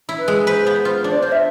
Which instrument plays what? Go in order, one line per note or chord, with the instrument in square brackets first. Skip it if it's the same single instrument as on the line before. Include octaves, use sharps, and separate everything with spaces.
[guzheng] E4
[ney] B4
[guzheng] G#3
[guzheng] B4 [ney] C5
[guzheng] B3
F4
[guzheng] D4 [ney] C5
[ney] D5
[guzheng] F4 [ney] C5
[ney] E5